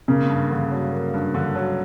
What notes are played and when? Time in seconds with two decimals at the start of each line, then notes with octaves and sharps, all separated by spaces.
0.08 C#3 A#3
0.29 G2
0.51 D3
0.71 F#3
0.92 A#3
1.14 G2
1.34 D3
1.55 F#3